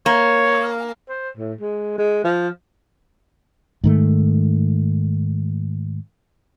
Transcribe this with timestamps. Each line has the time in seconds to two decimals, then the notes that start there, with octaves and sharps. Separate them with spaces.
0.06 A#3 C#5
1.09 C5
1.37 A2
1.61 G#3
1.98 G#3
2.24 F3
3.84 G#2 D#3 A3